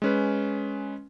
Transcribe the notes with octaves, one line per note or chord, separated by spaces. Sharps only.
G#3 C#4 B4